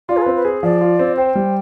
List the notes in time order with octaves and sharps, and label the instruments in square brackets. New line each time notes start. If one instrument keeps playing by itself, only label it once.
[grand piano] F4 [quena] D5
[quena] G#4
[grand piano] C4 [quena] B4
[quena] B4
[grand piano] G#4
[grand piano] F3 [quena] D5
[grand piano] F4
C4
[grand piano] C5 [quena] G5
[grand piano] G3